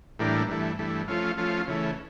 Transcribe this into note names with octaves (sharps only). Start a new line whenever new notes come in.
A2 E3 G3 A#3 D4
G2 E3 A3
G2 E3 A3
F3 A3 C#4 F4
F3 A3 C#4 F4
C#3 E3 A3